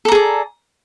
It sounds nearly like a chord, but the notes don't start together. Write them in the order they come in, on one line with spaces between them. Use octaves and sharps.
A4 A#5 G#4 D5